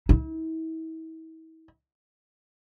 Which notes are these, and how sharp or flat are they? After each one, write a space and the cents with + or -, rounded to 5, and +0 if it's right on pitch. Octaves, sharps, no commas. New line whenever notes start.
E4 -40